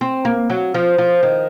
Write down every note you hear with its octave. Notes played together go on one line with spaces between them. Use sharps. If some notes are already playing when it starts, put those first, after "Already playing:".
C4
A#3
F#3
F3
F3
D#3